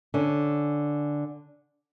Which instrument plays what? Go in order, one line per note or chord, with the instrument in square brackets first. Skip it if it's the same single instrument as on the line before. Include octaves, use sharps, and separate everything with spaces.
[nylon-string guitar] D3 C#4